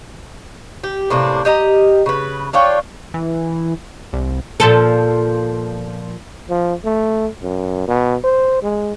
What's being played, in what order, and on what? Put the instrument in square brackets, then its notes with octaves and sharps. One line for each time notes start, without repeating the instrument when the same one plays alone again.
[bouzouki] G4
A2 C3 A#3 D4
G4 D#5 F5 A#5
C#3 B4
D4 F4 C#5 G5
[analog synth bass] E3
C2
[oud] A#2 F3 A4
[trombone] F3
A3
F#2
B2
C5
G#3